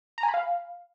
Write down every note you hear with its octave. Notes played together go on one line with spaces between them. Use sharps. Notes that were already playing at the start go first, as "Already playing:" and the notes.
A#5
G#5
B5
F5